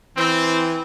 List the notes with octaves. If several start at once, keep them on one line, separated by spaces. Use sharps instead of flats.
E3 C4